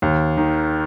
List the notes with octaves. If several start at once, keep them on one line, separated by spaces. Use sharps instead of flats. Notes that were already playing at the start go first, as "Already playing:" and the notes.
D#2
D#3